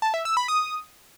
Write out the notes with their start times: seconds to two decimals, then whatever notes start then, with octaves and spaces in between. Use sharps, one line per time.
0.02 A5
0.14 E5
0.25 E6
0.37 B5
0.48 D#6